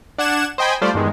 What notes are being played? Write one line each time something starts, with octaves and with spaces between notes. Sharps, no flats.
D4 F#5 G#6 E7
C5 D#5 G5 G#5 B5
G3 A3 F4 C5 D5
E2 G2 D#3 G#3